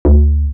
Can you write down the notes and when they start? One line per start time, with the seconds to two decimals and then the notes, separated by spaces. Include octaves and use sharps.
0.05 D2